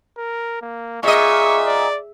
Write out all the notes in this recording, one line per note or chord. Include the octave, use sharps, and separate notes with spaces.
A#4
A#3
A#2 G#4 D#5 E5 C#6
D5